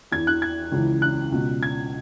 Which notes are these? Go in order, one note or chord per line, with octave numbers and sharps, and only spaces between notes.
E2 E3 G#6
F#6
G#6
C#2 C#3 E3
F#6
C#2 B2
G#6